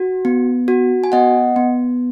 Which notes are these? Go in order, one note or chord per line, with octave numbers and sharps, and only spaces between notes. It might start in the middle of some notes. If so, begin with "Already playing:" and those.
Already playing: F#4
B3
F#4
G#5
B3 D#5 F#5
B3